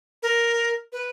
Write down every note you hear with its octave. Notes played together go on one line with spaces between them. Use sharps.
A#4
B4